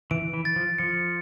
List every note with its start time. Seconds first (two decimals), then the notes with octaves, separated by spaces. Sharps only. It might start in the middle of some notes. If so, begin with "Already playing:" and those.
0.11 E3 D7
0.33 E3
0.45 A6
0.56 F3
0.78 F3 C#7